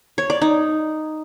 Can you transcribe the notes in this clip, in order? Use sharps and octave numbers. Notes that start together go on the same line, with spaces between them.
C#5
D5
D#4